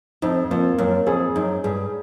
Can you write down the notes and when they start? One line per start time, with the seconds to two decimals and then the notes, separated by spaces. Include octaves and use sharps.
0.22 F2 D#4
0.51 F2 A#3
0.78 F#2 A#3
1.07 F2 G#4
1.36 F#2 D#4
1.64 G2 G#4